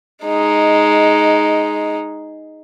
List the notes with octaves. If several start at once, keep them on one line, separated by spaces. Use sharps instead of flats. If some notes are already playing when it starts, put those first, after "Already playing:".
G#3 D#4